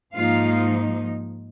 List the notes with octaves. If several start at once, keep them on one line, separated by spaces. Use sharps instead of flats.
G#2 F3 A#3 D#4 F4 F5